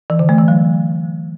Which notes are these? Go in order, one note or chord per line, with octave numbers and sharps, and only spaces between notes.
E3
D3
A3
E3
F#3